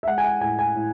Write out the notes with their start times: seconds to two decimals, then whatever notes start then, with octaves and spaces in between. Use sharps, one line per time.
0.03 E5
0.07 G#3 F#5
0.18 G#5
0.25 F#5
0.41 A2 G#5
0.59 G#5
0.75 A2